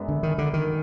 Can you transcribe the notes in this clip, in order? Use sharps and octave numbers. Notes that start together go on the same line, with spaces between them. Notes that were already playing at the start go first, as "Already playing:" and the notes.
Already playing: F#2 G#3 B3 D4
D3
D#3
D3
D#3